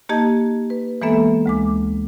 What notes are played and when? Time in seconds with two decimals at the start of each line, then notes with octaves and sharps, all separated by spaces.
0.09 A#3 D#4 G4 D#5 A5 G#6
0.70 B4
1.02 E3 G#3 A#3 B3 A4 E5
1.46 D2 G#3 D6